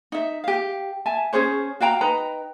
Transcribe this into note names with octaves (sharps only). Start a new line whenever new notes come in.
D#4 E5
G4 F5
E5 G#5 A5
C#4 G#4 C5 C#5
F#4 F5 G5 A#5
D#4 B4 G5 A#5